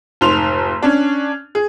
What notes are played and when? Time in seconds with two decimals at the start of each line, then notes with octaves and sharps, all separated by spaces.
0.21 F1 G#2 C6 F7
0.82 C#4 D4
1.55 G#4